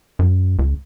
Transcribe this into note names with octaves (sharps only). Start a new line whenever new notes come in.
F#2
C#2